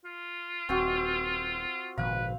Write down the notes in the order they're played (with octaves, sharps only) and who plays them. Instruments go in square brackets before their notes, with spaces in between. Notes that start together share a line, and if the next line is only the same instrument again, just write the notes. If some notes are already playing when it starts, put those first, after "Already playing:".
[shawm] F4
[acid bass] D#1 [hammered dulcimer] C4 F#4
[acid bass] G#1 [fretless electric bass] A#2 C#3 F3 [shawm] B4 [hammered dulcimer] F5